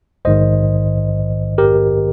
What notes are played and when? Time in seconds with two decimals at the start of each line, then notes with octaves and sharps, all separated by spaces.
0.25 A#1 G#2 D#3 C5 D#5
1.58 G4 A#4